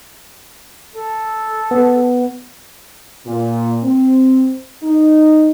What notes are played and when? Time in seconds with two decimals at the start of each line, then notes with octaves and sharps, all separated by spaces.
0.96 A4
1.71 B3
3.26 A#2
3.83 C4
4.83 D#4